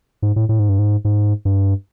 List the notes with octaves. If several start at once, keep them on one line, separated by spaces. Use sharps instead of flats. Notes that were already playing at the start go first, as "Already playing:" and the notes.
G#2
A2
A2
G#2
G2
G#2
G#2
G2